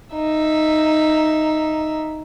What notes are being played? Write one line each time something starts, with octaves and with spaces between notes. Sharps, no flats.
D#4 E5